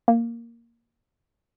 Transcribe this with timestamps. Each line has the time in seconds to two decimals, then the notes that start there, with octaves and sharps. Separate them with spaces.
0.08 A#3